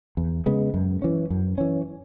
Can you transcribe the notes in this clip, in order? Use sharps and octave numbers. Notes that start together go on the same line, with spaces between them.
E2
C#3 G#3 B3
F#2
E3 C#4
F#2
E3 C#4